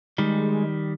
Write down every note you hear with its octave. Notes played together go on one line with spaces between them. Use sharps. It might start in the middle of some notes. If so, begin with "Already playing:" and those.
D#3 G3 G#3